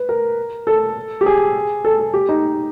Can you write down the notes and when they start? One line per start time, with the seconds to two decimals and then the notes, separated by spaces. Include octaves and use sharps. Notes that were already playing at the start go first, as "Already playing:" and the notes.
Already playing: B4
0.09 A#4
0.67 A4
1.21 G4
1.26 G#4
1.84 A4
1.99 A4
2.14 G4
2.29 D#4